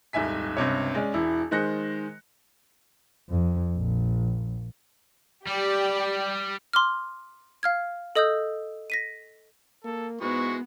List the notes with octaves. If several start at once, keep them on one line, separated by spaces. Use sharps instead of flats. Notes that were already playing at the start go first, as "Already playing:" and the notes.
D#1 C2 G#2 E5 G#5 B6
C#2 G2 C3 C#5
G#3 C#4 D5
E1 E3 E4
D#3 G#3 C5 F#6 A#6 C#7
F2
A#1
G3 G4 D5
C6 D6 F6
F5 F6 G#6
A4 D#5 D#6 E6 G6
A#6 B6 D#7
A#3 A4
G#2 G#3 B3 E4 F#4 C#6